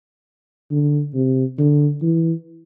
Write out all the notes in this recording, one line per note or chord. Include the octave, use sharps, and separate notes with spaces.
D3
C3
D3
E3